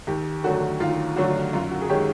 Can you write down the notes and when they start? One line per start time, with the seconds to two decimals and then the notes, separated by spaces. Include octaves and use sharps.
0.07 D#2 G4
0.44 D3 F#3 A3 F#4
0.80 D#2 F4
1.16 D3 F#3 A3 F#4
1.53 F#2 F4
1.71 F#4
1.81 G#4
1.89 D#3 G#3 C#4 G4